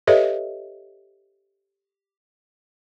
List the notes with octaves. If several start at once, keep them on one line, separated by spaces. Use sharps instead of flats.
G4 A4 B4 C#5 D#5 E5